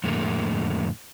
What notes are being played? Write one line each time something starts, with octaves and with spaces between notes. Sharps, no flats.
F2 A2 D3 G#3 A#3